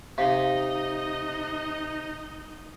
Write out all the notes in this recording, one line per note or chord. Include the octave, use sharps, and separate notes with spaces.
C3 D#4 D#5 F5